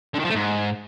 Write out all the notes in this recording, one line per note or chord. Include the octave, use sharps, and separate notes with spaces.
D3
D#3
F3
A3
G#2